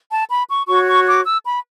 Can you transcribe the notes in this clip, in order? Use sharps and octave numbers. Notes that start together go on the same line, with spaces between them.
A5
B5
C#6
F#4 C#5 C#6
C#6
D6
E6
B5